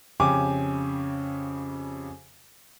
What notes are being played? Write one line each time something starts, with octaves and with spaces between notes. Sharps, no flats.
F2 C#3 C#4 G4 G#5 D6